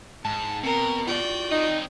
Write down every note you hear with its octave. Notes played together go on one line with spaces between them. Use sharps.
G#2 A5
B2 C4 A#4
F4 F#4 D5 G5
C4 D#4 D#5